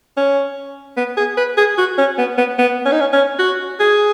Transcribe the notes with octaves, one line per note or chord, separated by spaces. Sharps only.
C#4
B3
G#4
B4
G#4
F#4
C#4
B3
B3
B3
C#4
D#4
C#4
C#4
F#4
G#4